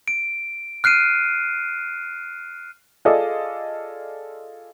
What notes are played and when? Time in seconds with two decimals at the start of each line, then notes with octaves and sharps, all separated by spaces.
0.08 D7
0.84 F6 F#6 C7 D7 D#7
3.05 F4 G#4 A4 D5 D#5